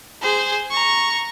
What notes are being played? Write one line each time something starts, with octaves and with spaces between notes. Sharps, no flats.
G#4 C5
A#5 C#6